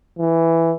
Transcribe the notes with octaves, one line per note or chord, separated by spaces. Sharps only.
E3